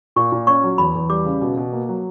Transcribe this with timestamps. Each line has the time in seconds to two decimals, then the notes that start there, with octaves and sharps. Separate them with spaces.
0.16 A#2 C#6
0.32 A#2
0.47 C#4 C#6
0.63 F#3
0.78 E2 B5
0.95 E2
1.09 G3 D6
1.25 C#3
1.41 B2
1.57 B2
1.73 A#3
1.89 F#3